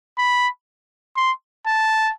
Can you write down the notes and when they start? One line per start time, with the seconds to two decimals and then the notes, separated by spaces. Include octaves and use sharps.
0.18 B5
1.17 C6
1.67 A5